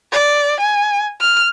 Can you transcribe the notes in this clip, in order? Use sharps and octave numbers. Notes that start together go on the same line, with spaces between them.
D5
G#5
F6